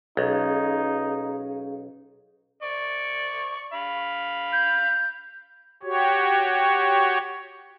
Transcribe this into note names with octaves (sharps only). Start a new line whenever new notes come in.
B1 C#4 D#4 G#4 F5
D5 C#6
F5 B5
G6
F#4 G4 C#5